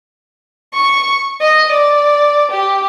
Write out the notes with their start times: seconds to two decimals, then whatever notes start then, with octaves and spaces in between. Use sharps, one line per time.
0.74 C#6
1.41 D#5
1.72 D5
2.51 G4